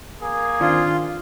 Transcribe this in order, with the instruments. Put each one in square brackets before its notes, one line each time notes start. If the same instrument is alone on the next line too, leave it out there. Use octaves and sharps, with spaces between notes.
[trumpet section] A#3 G#4
[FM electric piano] D#3 C4 D4 [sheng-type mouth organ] F4